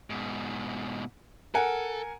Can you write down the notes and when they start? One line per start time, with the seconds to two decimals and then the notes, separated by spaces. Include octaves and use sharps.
0.10 G#2 B2
1.55 A4 A#4 F#5 G#5